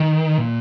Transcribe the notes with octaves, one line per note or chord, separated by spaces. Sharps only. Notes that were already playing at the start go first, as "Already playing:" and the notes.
Already playing: D#3
A#2